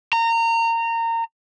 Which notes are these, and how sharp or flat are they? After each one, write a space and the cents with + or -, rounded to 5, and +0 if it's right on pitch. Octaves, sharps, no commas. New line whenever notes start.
A#5 -25